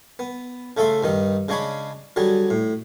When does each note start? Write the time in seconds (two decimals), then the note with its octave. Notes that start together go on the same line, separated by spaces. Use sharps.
0.19 B3
0.77 C#3 A3 A4 E5 C6
1.03 G2 D#3 D#4
1.48 C#3 G#3 C#4 D4 C#5 B5
2.16 D3 F#3 G3 G#4
2.50 A2